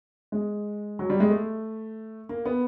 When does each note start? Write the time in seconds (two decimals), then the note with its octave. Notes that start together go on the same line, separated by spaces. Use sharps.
0.32 G#3
0.99 F#3
1.10 G3
1.20 G#3
1.30 A3
2.29 A#3
2.45 B3